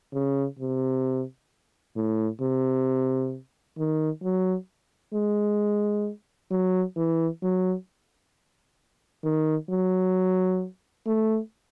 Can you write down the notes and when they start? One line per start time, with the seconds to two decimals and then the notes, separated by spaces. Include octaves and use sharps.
0.14 C#3
0.59 C3
1.96 A2
2.41 C3
3.78 D#3
4.23 F#3
5.14 G#3
6.51 F#3
6.96 E3
7.42 F#3
9.24 D#3
9.70 F#3
11.07 A3